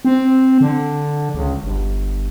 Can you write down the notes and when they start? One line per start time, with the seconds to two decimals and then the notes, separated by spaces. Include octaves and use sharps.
0.05 C4
0.61 D3
1.35 C#2
1.63 G1